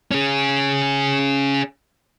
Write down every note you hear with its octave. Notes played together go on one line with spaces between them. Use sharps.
C#4 G#4